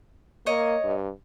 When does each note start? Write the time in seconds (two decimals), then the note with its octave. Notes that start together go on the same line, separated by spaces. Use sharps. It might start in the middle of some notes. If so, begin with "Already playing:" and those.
0.46 A#3 C#5 D#5
0.84 G2